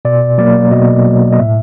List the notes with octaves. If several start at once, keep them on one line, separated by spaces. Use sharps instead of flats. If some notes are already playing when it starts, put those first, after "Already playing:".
B2 D5
F#3 A#3 D5
B2 D#5
F#3 A#3
D#5
A2 E5